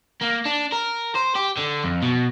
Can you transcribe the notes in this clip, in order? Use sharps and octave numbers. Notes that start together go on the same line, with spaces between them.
A#3
D4
A#4
C5
G4
D3
F2
B2